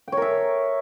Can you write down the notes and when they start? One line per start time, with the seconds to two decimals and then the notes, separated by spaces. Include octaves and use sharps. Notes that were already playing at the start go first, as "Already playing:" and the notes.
0.08 G5
0.12 C#5
0.17 A#4
0.22 E5